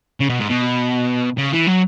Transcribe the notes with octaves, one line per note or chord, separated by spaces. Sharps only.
C#3
B2
G#2
B2
C#3
E3
F#3